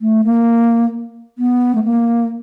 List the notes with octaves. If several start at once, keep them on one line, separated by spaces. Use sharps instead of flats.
A3
A#3
B3
A3
A#3